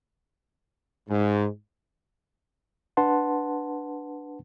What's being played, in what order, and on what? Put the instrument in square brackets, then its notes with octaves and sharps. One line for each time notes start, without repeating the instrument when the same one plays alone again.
[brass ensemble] G#2
[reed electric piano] D4 B4 F#5 A5 C6